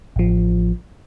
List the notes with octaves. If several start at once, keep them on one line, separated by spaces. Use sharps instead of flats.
A1 F3